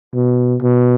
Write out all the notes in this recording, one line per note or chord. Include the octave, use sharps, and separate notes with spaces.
B2
B2